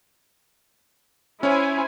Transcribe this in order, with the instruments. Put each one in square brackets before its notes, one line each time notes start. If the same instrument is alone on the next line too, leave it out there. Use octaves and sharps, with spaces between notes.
[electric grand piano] C#4 C#5 [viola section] E4 C5 G#5